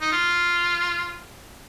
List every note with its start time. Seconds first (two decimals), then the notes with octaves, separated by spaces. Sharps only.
0.01 D#4
0.12 F4